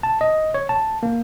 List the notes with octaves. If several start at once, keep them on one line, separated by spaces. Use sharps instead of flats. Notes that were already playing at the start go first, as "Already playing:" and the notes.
A5
D#5
C#5
A5
A#3